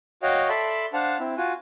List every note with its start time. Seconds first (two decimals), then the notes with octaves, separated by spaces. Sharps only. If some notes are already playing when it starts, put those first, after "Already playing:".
0.23 F#4 C#5 D#5 F5 G5
0.49 A4 D5 E5 A5 B5 C6
0.94 D4 C5 F5 F#5 A5
1.20 C4 E4
1.37 F4 F#4 G#5